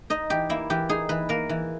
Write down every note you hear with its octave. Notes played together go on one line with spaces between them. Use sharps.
D#4 D#5
E3 G4
A#3 E4
E3 G4
D#4 G#4
E3 B4
A#3 A#4
E3